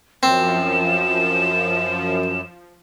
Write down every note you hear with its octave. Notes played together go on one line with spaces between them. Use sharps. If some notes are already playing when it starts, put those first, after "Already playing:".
F#2 F3 C4 E7